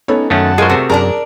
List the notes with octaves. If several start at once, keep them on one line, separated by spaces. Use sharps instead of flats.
B3 C#4 D#4 A4 C#5
F#2 D#3 A3 C#4 F#5 A5
G#3 F4 G#4 A#4 C5 C#6
C3 A3 F#4 C5
F#2 D4 G#4 A#4 D5 A5